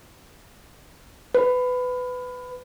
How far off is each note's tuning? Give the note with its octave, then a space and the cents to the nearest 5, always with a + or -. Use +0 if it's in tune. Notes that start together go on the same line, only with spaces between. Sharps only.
B4 +20